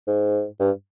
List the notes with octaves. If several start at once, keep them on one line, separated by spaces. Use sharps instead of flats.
G#2
G2